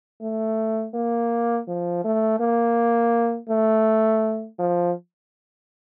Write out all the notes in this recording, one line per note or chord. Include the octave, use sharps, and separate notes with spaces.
A3
A#3
F3
A3
A#3
A3
F3